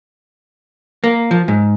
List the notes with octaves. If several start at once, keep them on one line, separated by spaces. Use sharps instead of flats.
A#3
F3
G#2